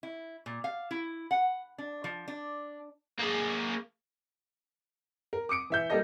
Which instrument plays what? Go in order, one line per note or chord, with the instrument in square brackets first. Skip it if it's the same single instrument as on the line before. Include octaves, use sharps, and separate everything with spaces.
[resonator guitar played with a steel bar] E4
A#2
F5
E4
F#5
D4
F3
D4
[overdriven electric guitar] A#3 G#4
[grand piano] A#4
D6 D#6 C#7 D7
E3 E5 G6
G3 A#3 G4 A4 D#5 A#6